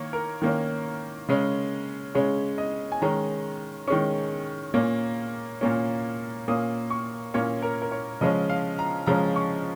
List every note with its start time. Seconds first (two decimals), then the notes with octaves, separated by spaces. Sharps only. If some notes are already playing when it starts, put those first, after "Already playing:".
Already playing: D#3 A#3 C#5
0.13 A#4
0.42 D#3 A#3 C#4
1.28 C#3 G#3 C#4
2.15 C#3 G#3 C#4 C#5
2.58 D#5
2.92 G#5
3.02 D#3 G#3 C#4 A#5
3.88 D#3 G#3 C#4 C#6
4.74 A#2 A#3 C#4
5.61 A#2 A#3 C#4
6.47 A#2 A#3 C#4 D#6
6.90 C#6
7.34 A#2 A#3 C#4 C#5
7.62 A#4
7.82 A#4
7.92 C#5
8.21 C#3 F3 G#3 C#4 D#5
8.50 F5
8.79 A#5
9.07 C#3 F3 G#3 C#4 A#5
9.36 C#6